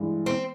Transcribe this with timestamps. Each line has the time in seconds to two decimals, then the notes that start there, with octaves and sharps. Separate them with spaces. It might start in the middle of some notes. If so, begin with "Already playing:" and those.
Already playing: G2 E3 G#3
0.26 C4